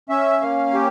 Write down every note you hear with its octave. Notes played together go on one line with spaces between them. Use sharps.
C#4 E5
A#3 F5
G4